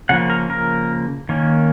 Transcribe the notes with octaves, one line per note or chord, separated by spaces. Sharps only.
C#3 F3 A#3 F#5
A#4
A#4
D#3 A#3 C#4